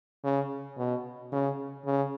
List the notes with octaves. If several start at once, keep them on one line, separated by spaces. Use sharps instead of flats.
C#3
B2
C#3
C#3